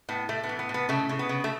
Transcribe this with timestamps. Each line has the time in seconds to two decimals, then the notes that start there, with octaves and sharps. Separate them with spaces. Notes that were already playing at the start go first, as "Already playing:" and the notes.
0.09 A2 B3
0.29 A2 A3
0.44 B3
0.49 E3
0.59 B3
0.69 A2
0.74 B3
0.89 C#3 A3
1.09 C#3
1.19 B3
1.29 C#3
1.44 A3